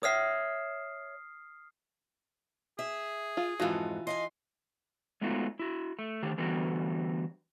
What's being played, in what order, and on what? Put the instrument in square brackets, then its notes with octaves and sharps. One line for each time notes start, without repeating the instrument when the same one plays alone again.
[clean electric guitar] C#5 E5 [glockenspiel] D#6 F6 C7
[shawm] G#4 [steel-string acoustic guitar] E5
[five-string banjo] F4
[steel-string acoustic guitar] F2 G#2 [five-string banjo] E3 F4 F#4
[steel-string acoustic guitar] D#5 F5 G#5 [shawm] C6
[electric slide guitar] G#3 A3 B3 D#4 F4 F#4
E4 F#4
A3
D3 D#3 A3 G4
D3 E3 G3 A3 B3 F#4